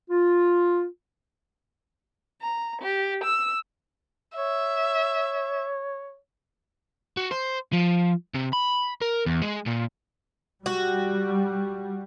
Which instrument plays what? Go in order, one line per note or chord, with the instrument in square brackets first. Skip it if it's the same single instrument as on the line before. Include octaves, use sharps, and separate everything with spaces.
[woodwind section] F4
[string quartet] A#5
G4
E6
[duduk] C#5 [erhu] E5
[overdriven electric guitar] F#4
C5
F3
C3
B5
A#4
E2
G#3
A#2
[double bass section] G3 [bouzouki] F#4